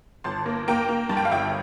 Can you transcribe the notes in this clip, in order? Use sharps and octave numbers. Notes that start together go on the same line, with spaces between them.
G1 A5 C6
A#3
A#3 G5 A#5
A#3
G2 A5
G5
F5
G1 E5 G5